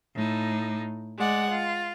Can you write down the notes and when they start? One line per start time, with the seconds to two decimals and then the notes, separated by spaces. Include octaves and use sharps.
0.15 A2 D#4
1.17 G#3 D5 F#5
1.50 F4